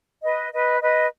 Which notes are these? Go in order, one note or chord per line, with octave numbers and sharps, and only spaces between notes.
B4 D#5
B4 D#5
B4 D#5